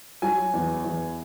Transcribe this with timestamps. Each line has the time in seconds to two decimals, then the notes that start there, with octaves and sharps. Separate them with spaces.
0.22 F#3 G#5
0.54 E2
0.84 E2